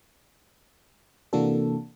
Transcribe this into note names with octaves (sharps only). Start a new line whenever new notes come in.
C3 E3 A#3 D4 F#4 A4